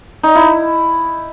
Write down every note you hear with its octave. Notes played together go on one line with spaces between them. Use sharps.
D#4
E4